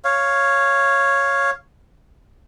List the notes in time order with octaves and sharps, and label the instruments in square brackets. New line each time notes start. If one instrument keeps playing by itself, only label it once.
[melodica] C#5 F5